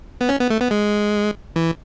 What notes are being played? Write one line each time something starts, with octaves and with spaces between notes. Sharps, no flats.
B3
C#4
B3
A3
B3
G#3
E3